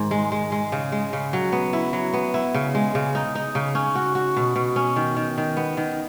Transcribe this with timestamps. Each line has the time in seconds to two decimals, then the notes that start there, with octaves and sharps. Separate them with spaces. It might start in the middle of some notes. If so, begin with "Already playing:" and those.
Already playing: G#2 D#3
0.11 G#3
0.32 G#3
0.52 G#3
0.72 C#3
0.92 G#3
1.13 C#3
1.33 F#3
1.52 B3
1.73 E4
1.93 F#3
2.14 B3
2.34 E4
2.54 C#3
2.75 G#3
2.95 C#3
3.15 D#4
3.35 D#4
3.55 C#3
3.75 C#4
3.95 F#4
4.15 F#4
4.37 B2
4.56 B2
4.76 C#4
4.96 D#3
5.17 D#3
5.38 D#3
5.57 B3
5.77 D#3